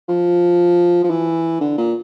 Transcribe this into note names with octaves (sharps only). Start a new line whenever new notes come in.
F3
F3
E3
D3
A#2